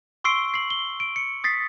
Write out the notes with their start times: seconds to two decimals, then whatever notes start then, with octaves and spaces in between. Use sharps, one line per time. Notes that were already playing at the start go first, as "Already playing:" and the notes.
0.24 C6 C#6 E6 C7 D7 G7
0.54 C7 F#7
0.70 G7
1.00 D7
1.16 C#7
1.44 D#6 A6 B6 C7